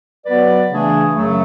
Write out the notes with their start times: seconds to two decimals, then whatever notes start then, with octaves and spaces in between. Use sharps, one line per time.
0.25 F#3 B3 F#4 B4 D5
0.69 C#3 E3 A3 D4 G#4
1.14 F#2 C#3 F#3 A3